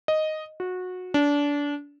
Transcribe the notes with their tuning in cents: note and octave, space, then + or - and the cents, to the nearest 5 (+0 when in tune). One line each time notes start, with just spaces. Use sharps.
D#5 +0
F#4 -20
D4 -25